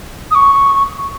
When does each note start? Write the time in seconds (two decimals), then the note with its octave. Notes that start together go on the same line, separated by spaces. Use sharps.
0.31 D#6
0.35 C#6